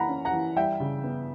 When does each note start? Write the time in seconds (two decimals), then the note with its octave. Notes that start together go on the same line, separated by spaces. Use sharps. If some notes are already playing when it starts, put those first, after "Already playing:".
Already playing: E3 A#3 F#5 A#5 B5
0.09 C#4
0.25 F#5 A#5
0.33 E3
0.56 G3 E5 G5
0.80 C#3
1.04 B3